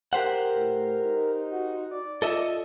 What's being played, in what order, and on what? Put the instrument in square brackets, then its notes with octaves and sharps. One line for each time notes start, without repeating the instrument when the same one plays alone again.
[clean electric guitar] G4 C5 F#5 [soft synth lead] A#4
[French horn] A2
D#4
[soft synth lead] F#4
D5
[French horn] F4 [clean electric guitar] A4 D#5 E5